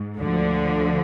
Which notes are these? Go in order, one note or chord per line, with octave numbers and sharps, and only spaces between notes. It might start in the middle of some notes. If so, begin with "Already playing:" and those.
Already playing: G#2
D2 D3 F3